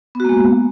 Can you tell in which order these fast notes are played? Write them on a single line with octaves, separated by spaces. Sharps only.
B3 F#4 A#3 G#3